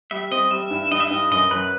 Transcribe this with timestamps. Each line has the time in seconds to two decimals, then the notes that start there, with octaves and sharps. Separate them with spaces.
0.11 G3 E5
0.31 C4 D#5
0.51 G3 E5
0.70 G2
0.91 G2 D#5
1.00 E5
1.08 G2 D#5
1.31 F#2 D#5
1.51 F#2 B4